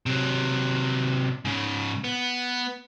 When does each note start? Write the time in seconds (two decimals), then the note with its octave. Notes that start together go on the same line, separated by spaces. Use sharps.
0.06 C3 F#3
1.45 G#2 C#3
2.04 B3